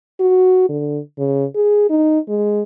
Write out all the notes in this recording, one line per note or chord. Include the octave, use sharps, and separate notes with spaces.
F#4
D3
C#3
G#4
D#4
G#3